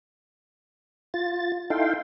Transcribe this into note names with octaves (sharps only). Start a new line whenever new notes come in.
F4 A6
D#4 E4 A4 F5 G5 C6